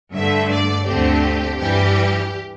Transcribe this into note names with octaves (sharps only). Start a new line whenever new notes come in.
G2 D3 A3 E5
D5
D2 D3 A3 C4 G4
G2 E3 G3 G4